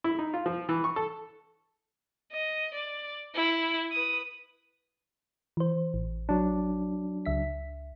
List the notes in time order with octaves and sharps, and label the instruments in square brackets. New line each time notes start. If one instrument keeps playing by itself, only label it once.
[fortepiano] E4
D#4
F4
F3
E3
C#6
A4
[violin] D#5
D5
E4
B4 D#6
[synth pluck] E3 C5
A1
[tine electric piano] F#3 D4
[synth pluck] C#2 E5 B6